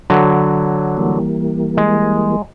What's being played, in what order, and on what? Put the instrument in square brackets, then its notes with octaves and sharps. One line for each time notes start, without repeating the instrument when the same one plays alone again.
[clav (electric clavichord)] D3 F#3
[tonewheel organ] E3 G3 A#3
[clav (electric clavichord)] G#3